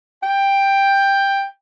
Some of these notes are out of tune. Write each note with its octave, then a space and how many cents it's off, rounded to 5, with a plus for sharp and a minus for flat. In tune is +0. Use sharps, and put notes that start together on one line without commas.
G5 +10